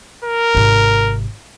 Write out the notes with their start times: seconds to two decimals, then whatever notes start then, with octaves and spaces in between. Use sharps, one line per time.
0.25 A#4
0.55 G#1 C3